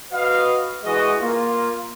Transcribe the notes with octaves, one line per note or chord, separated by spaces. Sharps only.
F#4 B4 D#5 F5
E3 G#3 F#4 D#5
A#3 F4